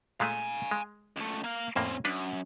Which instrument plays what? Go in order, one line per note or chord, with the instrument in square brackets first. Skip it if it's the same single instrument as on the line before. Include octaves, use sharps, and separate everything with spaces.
[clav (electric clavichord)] A#2 G#3 A3 [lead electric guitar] F5 G#5
[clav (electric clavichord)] G#3
[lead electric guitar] C#2 A3
A#3 F5
[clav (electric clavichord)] F2 A2 A#3 [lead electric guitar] C4 C#4
[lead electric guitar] F#2 [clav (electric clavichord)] D4 B4